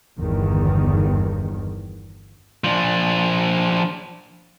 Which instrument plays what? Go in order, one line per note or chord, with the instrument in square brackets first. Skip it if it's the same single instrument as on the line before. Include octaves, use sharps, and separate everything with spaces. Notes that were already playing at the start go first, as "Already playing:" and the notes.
[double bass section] G1 E2 G2 D#3
[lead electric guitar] F3 D4